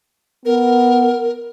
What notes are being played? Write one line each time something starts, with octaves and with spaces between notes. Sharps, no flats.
B3 A#4